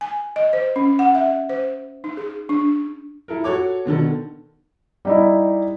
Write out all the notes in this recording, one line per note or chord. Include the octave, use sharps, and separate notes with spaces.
G#5
D#5
C5
C#4
F#5
E5
C5
D#4
G#4
D4
E4 A4 A#4
F#4 A4 C#5 D6
B2 D3 D#3 A4
G3 D#4 E4